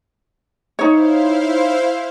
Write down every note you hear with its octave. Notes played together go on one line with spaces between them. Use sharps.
D#4 E4 C5 C#5 F5